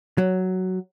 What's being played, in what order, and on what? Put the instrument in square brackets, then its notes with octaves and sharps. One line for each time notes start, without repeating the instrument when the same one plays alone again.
[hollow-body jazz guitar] F#3